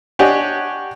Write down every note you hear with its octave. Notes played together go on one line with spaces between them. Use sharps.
D4 G4 C#5 D#5 F#5 G#5